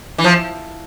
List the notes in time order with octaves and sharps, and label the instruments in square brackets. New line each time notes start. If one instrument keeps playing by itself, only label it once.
[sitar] E3
F3